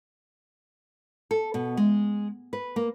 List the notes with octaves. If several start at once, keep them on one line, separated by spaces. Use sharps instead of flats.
A4
B2
G#3
B4
A#3